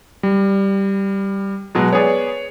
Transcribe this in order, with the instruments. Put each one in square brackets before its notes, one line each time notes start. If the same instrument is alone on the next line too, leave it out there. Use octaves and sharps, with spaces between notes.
[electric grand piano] G3
[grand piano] B2 F#3 G#3
[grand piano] B3 G#4 D5 [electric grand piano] C#5